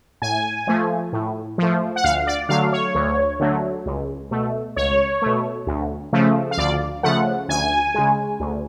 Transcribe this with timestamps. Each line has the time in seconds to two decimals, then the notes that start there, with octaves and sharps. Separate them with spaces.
0.22 A2 G#5
0.67 F3 A3
1.13 A2
1.58 F3 A3
1.96 F#5
2.04 D2 F5
2.27 D5
2.49 D3 F#3 A3 F5
2.72 C#5
2.95 D2
3.40 D3 F#3 A3
3.86 C#2
4.31 B2 A3
4.76 C#2 C#5
5.22 B2 A3
5.67 D2
6.12 C#3 F3 A3
6.51 F5
6.58 D2 D5
7.03 C#3 F3 A3 F#5
7.49 D2 G#5
7.94 C#3 G#3
8.40 D2